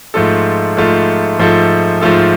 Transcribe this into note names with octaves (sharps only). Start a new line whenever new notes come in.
G#2 F3 A3 F4 A4
G#2 F3 A3 F4 A4
G#2 F3 A3 F4 A4
G#2 F3 A3 F4 A4